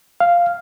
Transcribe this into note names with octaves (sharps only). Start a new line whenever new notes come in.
F5